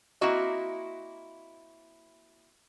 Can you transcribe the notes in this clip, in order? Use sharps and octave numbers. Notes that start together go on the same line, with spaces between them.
A#3 C4 E4 F#4 D#5